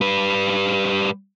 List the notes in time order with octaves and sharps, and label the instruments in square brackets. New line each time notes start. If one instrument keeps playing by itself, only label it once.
[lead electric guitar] G3 B4